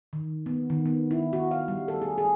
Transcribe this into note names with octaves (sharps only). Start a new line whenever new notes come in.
D#3
B3
D#3
B3
E4
F#4
F5
G3
A4
G#4
G#4